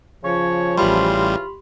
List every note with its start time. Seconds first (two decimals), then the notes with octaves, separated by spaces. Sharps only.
0.23 C#3 F3 C#5
0.78 A1 C#3 E3 G3 F4 G4 B5 C6